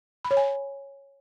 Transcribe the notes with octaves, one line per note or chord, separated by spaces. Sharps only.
B5
C#5
G#5